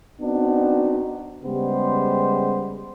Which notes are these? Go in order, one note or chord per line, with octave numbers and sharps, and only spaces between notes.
B3 C4 D4 D#4 F#4
C#3 G3 G#3 B3 G4 C5